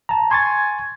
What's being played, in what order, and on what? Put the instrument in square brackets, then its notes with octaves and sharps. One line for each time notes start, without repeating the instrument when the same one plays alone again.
[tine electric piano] A5 A#5
[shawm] G#5 [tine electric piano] C6 C#6 A6